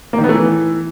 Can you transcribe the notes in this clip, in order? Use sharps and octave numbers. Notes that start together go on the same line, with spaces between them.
A#3
D#3
B3
A3
E3